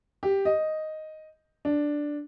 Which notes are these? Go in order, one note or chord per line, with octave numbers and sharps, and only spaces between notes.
G4
D#5
D4